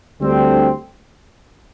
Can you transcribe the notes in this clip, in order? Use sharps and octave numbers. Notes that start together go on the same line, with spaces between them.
D2 D3 G3 C4